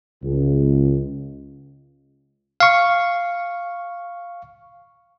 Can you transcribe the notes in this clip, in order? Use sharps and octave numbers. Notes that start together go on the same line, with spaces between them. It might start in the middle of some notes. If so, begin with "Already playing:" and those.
C#2
F5 C#6